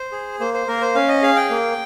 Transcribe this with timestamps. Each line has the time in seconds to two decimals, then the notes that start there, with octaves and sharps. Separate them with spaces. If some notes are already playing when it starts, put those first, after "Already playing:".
Already playing: C5
0.12 G#4
0.40 A#3 C5
0.54 C5
0.67 A#3 A#4
0.81 C5
0.95 C#4 F5
1.08 D#5
1.22 G#4 F5
1.36 G5
1.50 A#3